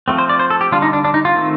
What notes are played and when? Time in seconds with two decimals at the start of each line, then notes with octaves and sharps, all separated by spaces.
0.08 F3 A3 C4
0.18 C5
0.29 D5
0.39 C5
0.50 A4
0.61 G4
0.72 D3 G3 D4 F4
0.82 D#4
0.93 D4
1.05 D4
1.14 D#4
1.25 F4
1.36 D#3 A3 C4